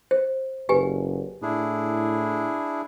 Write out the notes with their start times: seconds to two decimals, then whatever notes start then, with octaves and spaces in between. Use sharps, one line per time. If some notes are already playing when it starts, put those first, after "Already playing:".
0.11 C5
0.69 F#1 G4 B4 G#5
1.42 A2 D4 E4 G#4